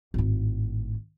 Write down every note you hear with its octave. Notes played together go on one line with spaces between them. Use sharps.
G#1 A2